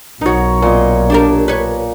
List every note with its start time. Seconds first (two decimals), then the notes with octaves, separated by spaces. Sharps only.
0.21 B1 D#4 F#4 A#4 C#5
0.62 A#2 C4 D#5
1.10 D4 G4 A#4
1.48 B4 C#5